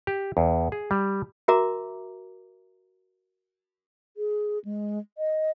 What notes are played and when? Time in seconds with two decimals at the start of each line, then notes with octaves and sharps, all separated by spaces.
0.07 G4
0.37 E2
0.72 G#4
0.91 G3
1.48 F#4 A#4 E5 A#5 D6
4.17 G#4
4.65 G#3
5.18 D#5